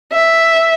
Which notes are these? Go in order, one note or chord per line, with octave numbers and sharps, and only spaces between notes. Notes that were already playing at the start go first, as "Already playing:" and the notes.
E5